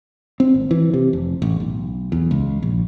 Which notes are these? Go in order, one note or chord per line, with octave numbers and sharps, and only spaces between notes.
C4
G#1
E3
C3
F1
A1
B1
E2
C#2
A#1